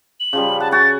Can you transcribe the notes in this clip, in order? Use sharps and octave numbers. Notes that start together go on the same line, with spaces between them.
F#7
C#3 F3 G3
F#5 A5
F#4 F#5 G#5 A6